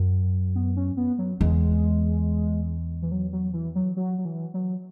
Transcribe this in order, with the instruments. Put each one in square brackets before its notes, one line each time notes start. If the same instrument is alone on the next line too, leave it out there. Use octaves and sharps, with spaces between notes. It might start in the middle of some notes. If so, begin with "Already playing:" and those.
Already playing: [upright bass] F#2
[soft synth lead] B3
C#4
B3
F#3
[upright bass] E2 [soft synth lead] G#3
[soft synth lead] E3
F#3
F#3
E3
F#3
F#3
F#3
E3
F#3